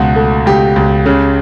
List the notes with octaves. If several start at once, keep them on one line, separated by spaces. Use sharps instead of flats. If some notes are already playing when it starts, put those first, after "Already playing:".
Already playing: C#2 B2 F#4
A3
C#2 G4
C#2
C#3